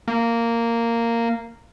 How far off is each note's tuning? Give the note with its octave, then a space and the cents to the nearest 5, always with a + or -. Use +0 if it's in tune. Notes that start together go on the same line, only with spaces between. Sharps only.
A#3 -10